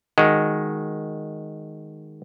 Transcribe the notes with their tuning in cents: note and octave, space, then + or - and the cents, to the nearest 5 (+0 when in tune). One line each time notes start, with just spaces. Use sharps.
D#3 +0 G#3 +0 F#4 +0